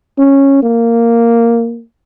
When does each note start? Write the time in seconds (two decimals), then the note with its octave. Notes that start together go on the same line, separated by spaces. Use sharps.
0.18 C#4
0.63 A#3